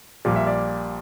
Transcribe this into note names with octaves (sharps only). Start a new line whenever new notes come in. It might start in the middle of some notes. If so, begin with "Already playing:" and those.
A#1 A#2 G3 D5
E5
D5